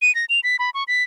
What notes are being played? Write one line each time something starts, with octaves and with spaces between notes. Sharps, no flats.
D#7
A#6
F7
B6
B5
C#6
B6